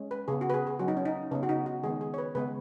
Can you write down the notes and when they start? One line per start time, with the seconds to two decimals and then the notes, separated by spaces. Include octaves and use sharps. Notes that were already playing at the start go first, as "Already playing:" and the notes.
Already playing: G#3 C#4
0.11 B4
0.28 C#3 B3 G#4
0.41 F#4
0.50 B4
0.54 G#4
0.67 G#4
0.79 F#3 C#4 F#4
0.88 D#4
0.97 C#4
1.06 D#4
1.31 C#3 B3 C#4
1.43 F#4
1.49 D#4
1.66 F#4
1.83 D#3 G#3 B3 G#4
2.01 G#4
2.14 C#5
2.18 B4
2.35 C#3 G#3 B3 B4